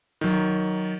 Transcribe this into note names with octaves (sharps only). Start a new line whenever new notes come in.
D#3 F#3